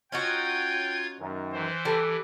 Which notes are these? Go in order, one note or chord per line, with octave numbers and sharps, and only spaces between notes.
C#4 D#4 F4 F#4 G5 G#6
F#2 D#3
E3 C5
G3 A4